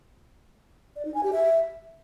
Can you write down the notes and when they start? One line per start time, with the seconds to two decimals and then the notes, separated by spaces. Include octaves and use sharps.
0.96 D5
1.05 D#4
1.14 G#5
1.23 G4
1.33 E5